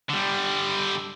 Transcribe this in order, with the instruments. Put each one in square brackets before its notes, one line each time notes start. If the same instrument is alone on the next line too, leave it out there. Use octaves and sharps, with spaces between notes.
[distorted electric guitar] D3 G3